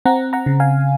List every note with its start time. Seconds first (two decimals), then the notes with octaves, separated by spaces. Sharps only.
0.06 C4 F#5 A#5
0.33 F#5 A#5
0.46 C#3
0.60 F5 G#5